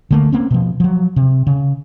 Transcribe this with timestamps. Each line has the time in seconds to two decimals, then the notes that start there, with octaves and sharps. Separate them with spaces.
0.11 D3 A3 A#3
0.32 A#3 C4 C#4
0.51 B2 F3
0.80 F3 F#3
1.16 C3
1.47 C#3